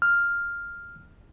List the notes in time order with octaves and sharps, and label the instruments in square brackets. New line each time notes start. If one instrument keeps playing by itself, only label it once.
[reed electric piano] F6